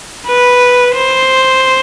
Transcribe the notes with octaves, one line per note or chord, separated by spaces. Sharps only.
B4
C5